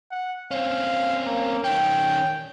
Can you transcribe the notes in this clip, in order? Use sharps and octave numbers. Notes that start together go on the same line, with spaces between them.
F#5
C4 C#4 F5
A#3
D#3 C#4 G5